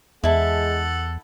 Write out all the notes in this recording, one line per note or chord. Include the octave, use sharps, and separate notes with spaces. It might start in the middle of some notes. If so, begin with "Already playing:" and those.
E2 G#3 E4 A4 F#5 A5